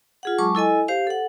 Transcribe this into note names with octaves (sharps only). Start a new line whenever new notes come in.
F4 G#4 F#5
F#3 G#3 A5 C#6 D6
E4 A4 D#5 G#5
G4 C5 F5
A4 F#5